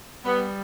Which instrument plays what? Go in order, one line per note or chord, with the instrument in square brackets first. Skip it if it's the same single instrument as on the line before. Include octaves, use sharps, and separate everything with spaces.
[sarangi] G3 [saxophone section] B3